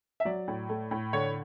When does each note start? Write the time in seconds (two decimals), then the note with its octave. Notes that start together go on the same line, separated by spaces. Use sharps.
0.20 E5
0.25 F#3 D5
0.48 A2
0.69 A3
0.91 A2
1.13 D3 C#5